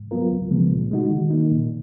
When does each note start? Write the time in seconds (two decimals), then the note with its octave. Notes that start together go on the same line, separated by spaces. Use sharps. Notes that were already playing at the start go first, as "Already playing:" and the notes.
Already playing: G#2
0.11 F#3 B3 F4 A#4
0.31 C#2
0.51 C#3 F3 G#3 B3
0.72 A#2
0.91 G#3 D#4 F#4
1.11 D#3
1.31 A#3 D#4
1.51 A#2